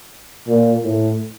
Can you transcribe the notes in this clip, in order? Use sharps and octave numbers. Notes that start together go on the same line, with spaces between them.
A#2
A2